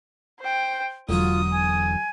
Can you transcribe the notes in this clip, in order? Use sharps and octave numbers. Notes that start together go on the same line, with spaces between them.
C5 G5
E1 D3 F#3 F4 F#4 D#6
G#5